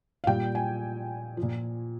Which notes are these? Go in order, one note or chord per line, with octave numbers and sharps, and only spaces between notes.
F5
A#2 G3 G5
G#5
F3
A#2